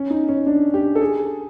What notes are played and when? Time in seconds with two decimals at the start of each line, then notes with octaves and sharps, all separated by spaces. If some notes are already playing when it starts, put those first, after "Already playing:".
Already playing: C#4
0.10 D#4
0.29 C#4
0.46 D4
0.74 G4
0.95 A4
1.02 G#4